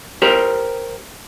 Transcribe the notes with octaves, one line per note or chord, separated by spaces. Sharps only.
G4 A#4 C5